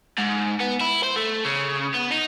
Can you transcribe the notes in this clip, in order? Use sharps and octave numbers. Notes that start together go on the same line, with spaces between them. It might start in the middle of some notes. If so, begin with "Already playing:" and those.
G#2
B3
E4
C5
A3
C#3
B3
D#4